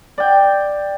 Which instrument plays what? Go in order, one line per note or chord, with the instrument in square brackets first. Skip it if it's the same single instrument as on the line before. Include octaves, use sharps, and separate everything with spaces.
[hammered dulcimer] D5 G5